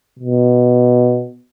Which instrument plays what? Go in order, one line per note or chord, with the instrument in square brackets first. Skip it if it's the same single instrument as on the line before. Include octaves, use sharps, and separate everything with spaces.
[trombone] B2